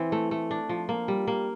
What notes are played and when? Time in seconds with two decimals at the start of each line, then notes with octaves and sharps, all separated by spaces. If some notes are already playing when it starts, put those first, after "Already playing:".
Already playing: E3 C4
0.12 A3
0.31 A3
0.51 D4
0.69 F3
0.89 A#3
1.08 G3
1.27 A#3